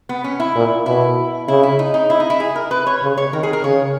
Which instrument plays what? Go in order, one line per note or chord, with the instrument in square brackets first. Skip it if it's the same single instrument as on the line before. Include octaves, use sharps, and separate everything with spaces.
[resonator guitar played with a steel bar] B3
C#4
E4
[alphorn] A#2
[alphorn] B2 [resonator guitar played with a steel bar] E4
[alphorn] C#3 [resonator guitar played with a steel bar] E4
[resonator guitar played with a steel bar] E4
D#4
D#4
E4
D#4
E4
G#4
A#4
B4
C#5
[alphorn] C#3
[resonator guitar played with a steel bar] C#5
[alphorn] D#3 [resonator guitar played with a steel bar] A#4
[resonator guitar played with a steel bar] G#4
A#4
[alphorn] C#3 [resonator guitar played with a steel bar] C#5